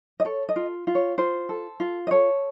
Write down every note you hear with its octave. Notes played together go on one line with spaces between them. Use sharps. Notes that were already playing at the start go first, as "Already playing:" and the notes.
D#5
A4 C#5
D#5
F4
F4
C#5
F4 C5
A4
F4
D#5
A4 C#5